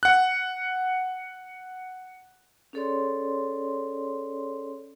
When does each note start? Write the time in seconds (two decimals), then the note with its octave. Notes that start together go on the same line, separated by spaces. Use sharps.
0.03 F#5 F#6
2.73 C#4 G#4 A4 C#5 D5 C6